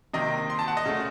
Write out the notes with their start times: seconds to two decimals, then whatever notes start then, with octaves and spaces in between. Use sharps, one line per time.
0.14 C3 D#3 A#3 D#5
0.50 C6
0.59 A5
0.68 F#5
0.77 D#5
0.86 C#3 A3